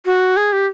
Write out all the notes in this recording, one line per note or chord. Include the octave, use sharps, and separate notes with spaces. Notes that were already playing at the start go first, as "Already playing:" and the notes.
F#4
G#4
G4